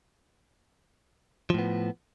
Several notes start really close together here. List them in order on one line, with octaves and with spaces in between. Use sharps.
F3 A2 B3